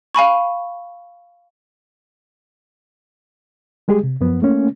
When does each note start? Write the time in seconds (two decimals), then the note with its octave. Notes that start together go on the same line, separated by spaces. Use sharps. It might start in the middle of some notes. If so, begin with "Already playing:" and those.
0.15 F5 G#5 B5 C#6
3.88 G3 G#3 G4 G#4
4.03 C3
4.21 F#2 F3 B3
4.42 A3 A#3 C#4